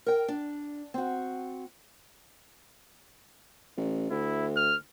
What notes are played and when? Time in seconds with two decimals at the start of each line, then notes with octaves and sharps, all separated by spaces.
0.06 A#4 G5
0.28 D4
0.94 C4 F#4
3.77 A1
4.11 D2 E4
4.56 F6